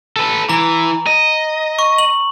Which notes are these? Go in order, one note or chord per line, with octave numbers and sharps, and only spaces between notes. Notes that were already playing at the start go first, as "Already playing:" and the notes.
A4 B4
E3 A#5
D#5
C#6
F#7